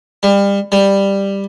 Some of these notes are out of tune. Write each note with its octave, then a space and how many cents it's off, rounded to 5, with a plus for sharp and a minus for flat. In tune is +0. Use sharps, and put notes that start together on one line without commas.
G3 +30
G3 +10